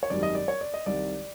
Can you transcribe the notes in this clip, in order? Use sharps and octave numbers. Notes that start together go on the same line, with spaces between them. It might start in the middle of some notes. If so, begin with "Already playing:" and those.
C#5
G#1 F#2 D#3 G3 D5
D#5
D5
C#5
D5
D#5
C2 C3 D#3 D5